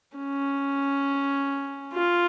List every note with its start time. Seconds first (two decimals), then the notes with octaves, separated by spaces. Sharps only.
0.18 C#4
1.94 F4